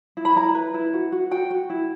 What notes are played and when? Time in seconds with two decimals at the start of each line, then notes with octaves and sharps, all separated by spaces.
0.17 E4
0.25 B5
0.36 E4 A#5
0.55 B4
0.74 E4
0.94 F#4
1.12 F#4
1.31 F#4 G5
1.50 F#4
1.70 E4